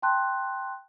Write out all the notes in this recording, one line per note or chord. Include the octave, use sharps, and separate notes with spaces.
G5 A5 C6 F#6